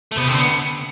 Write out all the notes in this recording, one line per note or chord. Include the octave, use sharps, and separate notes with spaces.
A3
C3 B3
D3 C4
B3